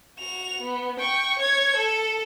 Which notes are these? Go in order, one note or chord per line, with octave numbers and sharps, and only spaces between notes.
F#4 F7
B3
G5 C#6
C#5 G#6
A4